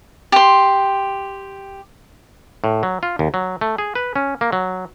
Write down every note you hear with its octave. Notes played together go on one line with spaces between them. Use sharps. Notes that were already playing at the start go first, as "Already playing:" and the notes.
G4 C6
A2
F#3
F4
D#2
F#3
A3
G#4
B4
C#4
A#3
F#3